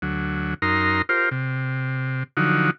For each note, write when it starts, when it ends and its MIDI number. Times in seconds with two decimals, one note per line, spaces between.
0.02 0.54 38
0.02 0.54 54
0.62 1.02 42
0.62 1.02 63
0.62 1.02 70
0.62 1.02 82
0.62 1.02 84
1.09 1.29 65
1.09 1.29 67
1.09 1.29 70
1.09 1.29 72
1.31 2.23 48
2.37 2.71 50
2.37 2.71 53
2.37 2.71 54
2.37 2.71 63
2.37 2.71 66